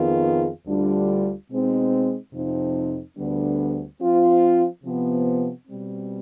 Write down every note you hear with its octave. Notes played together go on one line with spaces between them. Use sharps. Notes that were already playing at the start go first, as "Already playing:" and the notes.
Already playing: F2 D#3 B3 F4 G#4
D2 D3 G3 D4 F4
B2 G#3 C4 D#4
F2 C3 F3 C4 D#4
D2 D3 G3 B3 D4
F3 C4 F4
C3 F3 B3
B2 G3 C4